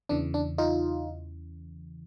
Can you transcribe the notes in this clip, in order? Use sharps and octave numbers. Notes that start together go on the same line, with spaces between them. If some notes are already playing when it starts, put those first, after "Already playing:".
E2 C#3 E3 D4
D4
D#4 F4